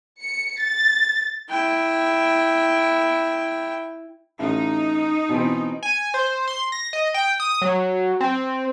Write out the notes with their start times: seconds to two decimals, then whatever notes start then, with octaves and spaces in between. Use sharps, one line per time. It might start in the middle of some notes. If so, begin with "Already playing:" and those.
0.22 C#7
0.59 A6
1.50 E4 G5
4.39 A1 D#4
5.29 B2 E3 C4
5.83 G#5
6.14 C5
6.48 C6
6.72 A#6
6.93 D#5
7.14 G5
7.40 D#6
7.62 F#3
8.21 C4